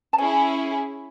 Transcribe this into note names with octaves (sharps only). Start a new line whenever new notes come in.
A5
C#4 E4 G#4 G#5